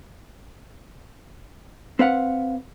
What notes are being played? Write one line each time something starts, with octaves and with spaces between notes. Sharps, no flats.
C4 B4 F5 F#5